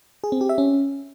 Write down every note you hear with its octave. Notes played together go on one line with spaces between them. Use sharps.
G#4
C4
G4
E5
C#4